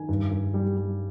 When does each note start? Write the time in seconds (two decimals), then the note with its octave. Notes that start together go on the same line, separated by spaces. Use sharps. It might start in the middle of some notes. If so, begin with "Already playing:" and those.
Already playing: D#3 G#5
0.09 G2
0.31 G2
0.54 G3
0.77 G3